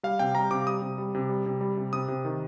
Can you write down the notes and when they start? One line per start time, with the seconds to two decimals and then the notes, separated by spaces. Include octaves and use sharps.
0.03 G3 F5
0.19 C3 G5
0.35 G3 A#5
0.51 C3 D6
0.67 G3 D#6
0.82 C3
0.98 G3
1.15 C3
1.29 G3
1.46 C3
1.61 G3
1.77 C3
1.93 C3 D#6
2.08 C3
2.25 D#3